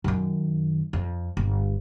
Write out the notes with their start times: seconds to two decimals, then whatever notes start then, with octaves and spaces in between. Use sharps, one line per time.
0.04 F#2 D#3
0.93 F2
1.37 G1